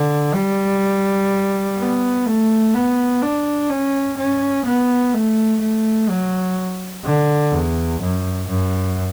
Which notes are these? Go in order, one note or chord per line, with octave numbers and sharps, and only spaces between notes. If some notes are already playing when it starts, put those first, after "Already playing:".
Already playing: D3
G3
B3
A3
B3
D4
C#4
C#4
B3
A3
A3
F#3
D3
E2
F#2
F#2